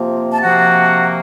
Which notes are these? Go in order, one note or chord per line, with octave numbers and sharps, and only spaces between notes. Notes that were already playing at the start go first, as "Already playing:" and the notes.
Already playing: C3 F3 A#3
A5
C3 F3 A#3 F#4 F#5